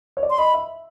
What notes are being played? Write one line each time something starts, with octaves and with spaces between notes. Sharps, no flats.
C#5
D5
C6
D#5 B5
E5